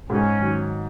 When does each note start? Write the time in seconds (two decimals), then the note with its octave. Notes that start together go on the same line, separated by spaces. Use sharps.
0.09 G#2 C#4
0.40 D#3 F#3